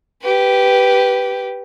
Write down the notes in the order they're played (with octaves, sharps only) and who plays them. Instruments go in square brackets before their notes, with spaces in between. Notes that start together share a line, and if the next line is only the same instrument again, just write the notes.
[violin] G4 B4